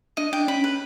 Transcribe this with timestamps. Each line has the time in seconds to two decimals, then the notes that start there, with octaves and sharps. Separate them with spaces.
0.17 D4 D#5
0.33 D4 G5
0.48 C#4 B5
0.64 B4